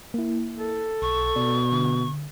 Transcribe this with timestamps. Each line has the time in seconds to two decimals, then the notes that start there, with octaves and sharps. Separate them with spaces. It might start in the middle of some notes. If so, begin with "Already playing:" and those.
0.14 A#3 E4
0.57 A4
1.02 B1 C#6
1.36 B2 D5
1.72 D3